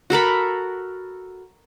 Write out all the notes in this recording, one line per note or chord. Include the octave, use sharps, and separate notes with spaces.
F#4 A4 A#4 B5